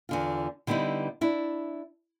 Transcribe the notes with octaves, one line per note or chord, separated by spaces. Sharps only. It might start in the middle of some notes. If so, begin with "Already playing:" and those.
E2 D3 F4
D3 G3 B3 D#4 E4
D4 E4